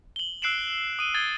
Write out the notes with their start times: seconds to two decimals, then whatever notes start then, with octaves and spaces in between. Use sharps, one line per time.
0.16 F#7 G7
0.42 E6 F#6 C7 D7 E7 F#7
0.99 D#6 D#7 E7 G7
1.14 D#6 G#6 A6 G7